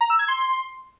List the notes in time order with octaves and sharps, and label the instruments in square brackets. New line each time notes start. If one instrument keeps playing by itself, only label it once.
[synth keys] A#5
E6
G#6
C6